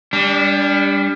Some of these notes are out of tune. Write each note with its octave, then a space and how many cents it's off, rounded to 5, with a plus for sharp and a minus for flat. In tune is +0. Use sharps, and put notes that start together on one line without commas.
G3 +25 D4 -25